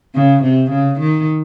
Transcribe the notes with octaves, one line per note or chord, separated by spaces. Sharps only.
C#3
C3
C#3
D#3